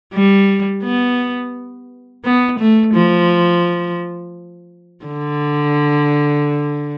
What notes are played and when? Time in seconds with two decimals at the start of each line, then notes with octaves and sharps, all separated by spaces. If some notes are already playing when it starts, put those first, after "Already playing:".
0.14 G3
0.84 B3
2.24 B3
2.59 A3
2.94 F3
5.05 D3